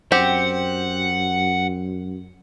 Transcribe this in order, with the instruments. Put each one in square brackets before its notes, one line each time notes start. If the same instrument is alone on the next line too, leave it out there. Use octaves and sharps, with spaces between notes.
[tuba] F#2 [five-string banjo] C4 G4 [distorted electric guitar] F#5